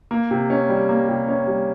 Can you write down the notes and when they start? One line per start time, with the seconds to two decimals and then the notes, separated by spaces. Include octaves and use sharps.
0.11 A#3
0.31 C3
0.50 C#4
0.69 G3
0.89 A#3
1.09 C3
1.28 C#4
1.48 G3